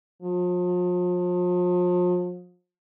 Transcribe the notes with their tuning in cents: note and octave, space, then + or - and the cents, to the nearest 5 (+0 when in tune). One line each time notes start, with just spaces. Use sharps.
F3 +40